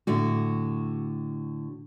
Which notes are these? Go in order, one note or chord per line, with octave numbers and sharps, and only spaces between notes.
A2 D3 F#4